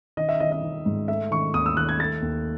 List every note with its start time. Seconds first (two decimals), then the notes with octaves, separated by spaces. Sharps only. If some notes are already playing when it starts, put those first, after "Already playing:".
0.17 D#3 D#5
0.29 E5
0.40 D#3 D#5
0.52 D#5
0.63 D#3
0.86 G#2
1.08 A3 E5
1.31 D#3 C#6
1.54 D#2 D#6
1.66 E6
1.77 D#3 F#6
1.89 G#6
2.00 A3 A6
2.22 D#2